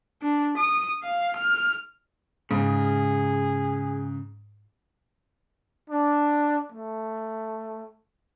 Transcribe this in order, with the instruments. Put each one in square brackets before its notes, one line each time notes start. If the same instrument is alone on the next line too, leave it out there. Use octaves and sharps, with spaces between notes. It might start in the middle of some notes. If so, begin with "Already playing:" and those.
[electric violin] D4
D#6
F5
F6
[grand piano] G#2 [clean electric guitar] C#3 [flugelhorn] G#4
[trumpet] D4
A3